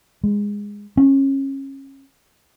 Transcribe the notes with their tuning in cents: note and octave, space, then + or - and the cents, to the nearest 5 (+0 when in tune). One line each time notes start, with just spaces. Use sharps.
G#3 -15
C#4 -30